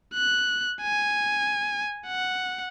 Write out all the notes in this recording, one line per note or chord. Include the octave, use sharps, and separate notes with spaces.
F#6
G#5
F#5